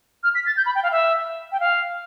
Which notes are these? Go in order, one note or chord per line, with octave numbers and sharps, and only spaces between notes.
F6
B6
A6
G6
B5
G5
F5
E5
G5
F5